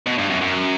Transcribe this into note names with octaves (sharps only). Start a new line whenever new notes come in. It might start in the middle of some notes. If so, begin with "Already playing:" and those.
B2
G2
F#2
F#2